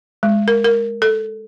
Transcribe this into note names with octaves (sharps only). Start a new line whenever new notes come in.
G#3
A#4
A#4
A4